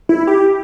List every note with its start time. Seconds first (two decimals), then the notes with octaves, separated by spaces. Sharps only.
0.09 E4
0.27 G4